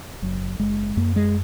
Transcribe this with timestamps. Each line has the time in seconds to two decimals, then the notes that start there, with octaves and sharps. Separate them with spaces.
0.22 F#1 F#3
0.59 F#1 G#3
0.97 F#2 A#3
1.16 G#3